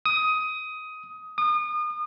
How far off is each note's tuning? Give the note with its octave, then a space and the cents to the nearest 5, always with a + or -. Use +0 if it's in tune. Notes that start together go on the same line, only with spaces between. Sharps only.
D#6 +15
D#6 -35